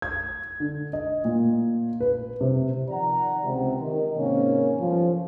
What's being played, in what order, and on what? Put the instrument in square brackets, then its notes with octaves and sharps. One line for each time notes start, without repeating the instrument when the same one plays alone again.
[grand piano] G#6
D3
D#5
A#2
B4
C3
[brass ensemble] D#3 F3 D5 F#5 A#5
C#2 C3
D#3
G#2 C3 D#3 A#3 C4 C#4
G1 F3